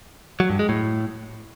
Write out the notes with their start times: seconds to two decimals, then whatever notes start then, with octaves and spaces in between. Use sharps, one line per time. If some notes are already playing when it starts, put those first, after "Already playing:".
0.40 F#3
0.50 G2
0.59 G#3
0.69 A2